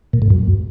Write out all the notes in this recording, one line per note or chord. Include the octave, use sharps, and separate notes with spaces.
A#2
A2
F#2